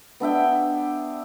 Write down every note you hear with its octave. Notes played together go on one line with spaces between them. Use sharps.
B3 D4 E5 G5